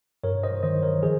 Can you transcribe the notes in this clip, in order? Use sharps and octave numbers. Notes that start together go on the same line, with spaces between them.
G2 A#4 C#5
C5 D#5
D#3 C5 D#5
A#4 C#5
F3 G#4 C5